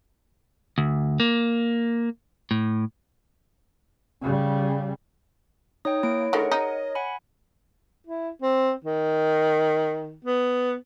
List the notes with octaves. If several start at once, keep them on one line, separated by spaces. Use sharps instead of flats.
D2
A#3
A2
C#3 G3
D#4 C#5 G5 D#6
A#3 E4 D7
D3 D#3 A3 G#4 A#4 F#5
D#4 A#4 D#5
F#5 G#5 B5
E4
C4
D#3
B3